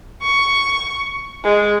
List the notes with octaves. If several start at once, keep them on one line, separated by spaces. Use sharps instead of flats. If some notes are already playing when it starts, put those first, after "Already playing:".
C#6
G#3